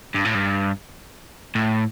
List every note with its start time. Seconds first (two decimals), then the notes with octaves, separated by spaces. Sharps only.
0.14 G2
0.25 A2
0.34 G2
1.55 A2